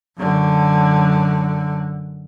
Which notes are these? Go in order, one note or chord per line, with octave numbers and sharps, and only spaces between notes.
F#2 D3